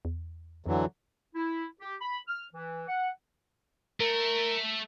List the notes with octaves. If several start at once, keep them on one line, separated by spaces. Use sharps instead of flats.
E2
F2 D3 E3 F#3
E4
G4
B5
F6
E3
F#5
A3 A#4